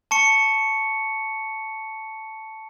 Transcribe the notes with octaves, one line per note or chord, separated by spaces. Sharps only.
A5 C#6 C#7